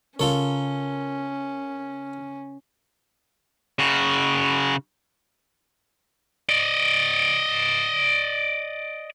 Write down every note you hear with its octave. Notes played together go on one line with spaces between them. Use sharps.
C#3 C#4 F4 A4 A#4 C#5
C#3 F#4
D5 D#5